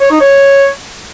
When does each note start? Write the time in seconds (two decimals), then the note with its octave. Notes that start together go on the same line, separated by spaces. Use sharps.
0.01 C#5
0.11 D#4
0.21 C#5